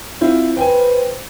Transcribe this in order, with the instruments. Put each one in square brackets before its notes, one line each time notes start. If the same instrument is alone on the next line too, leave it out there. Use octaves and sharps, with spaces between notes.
[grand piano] C4 E4 F4
[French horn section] B4 C5 [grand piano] G5 G#5